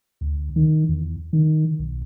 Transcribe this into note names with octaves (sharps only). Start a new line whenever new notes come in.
D2
D#3
E2
D#3
B1